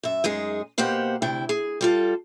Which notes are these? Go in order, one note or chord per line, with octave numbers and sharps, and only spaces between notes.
F#2 E5
F#2 G#3 D#4 G#4
B2 A#3 G4 C5 F#5
D2 C3 E4 G5
G#4
G3 F4 A4